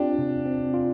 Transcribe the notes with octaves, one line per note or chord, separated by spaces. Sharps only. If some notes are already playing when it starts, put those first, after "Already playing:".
Already playing: C4 D4 F4 G4
C3
C4
F4